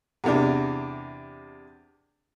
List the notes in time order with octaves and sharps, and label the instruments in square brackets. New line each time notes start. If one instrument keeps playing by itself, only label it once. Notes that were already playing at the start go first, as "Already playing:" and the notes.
[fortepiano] E2 C3 D4